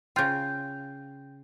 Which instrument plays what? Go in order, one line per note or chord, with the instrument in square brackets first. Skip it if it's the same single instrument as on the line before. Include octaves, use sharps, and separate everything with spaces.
[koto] C#3 F4 [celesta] G5 G6